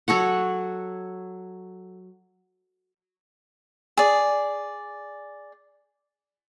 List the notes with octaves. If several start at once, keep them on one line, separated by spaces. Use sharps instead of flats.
F#3 A4 C#5 F#5
G#4 D5